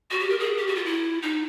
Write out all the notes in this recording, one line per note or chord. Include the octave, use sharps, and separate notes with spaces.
F#4
G4
A#4
G#4
G4
F#4
F4
E4
D#4